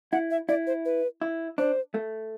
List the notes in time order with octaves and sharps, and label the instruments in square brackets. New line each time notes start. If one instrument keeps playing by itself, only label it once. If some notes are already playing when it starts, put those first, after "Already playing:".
[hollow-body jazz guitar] E4 [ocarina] F#5
[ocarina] E5
[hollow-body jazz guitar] E4 [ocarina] D5
[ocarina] C5
B4
[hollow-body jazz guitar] E4
[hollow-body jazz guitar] D4 [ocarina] C5
[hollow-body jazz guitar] A3